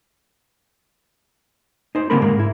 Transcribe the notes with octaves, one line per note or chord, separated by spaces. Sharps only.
D#4 C5
D3 G3 A#3 C4 A#4 B5
G#2 G#3 A#3
E4